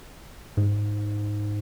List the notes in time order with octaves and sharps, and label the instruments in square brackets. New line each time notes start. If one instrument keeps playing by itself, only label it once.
[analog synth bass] G#2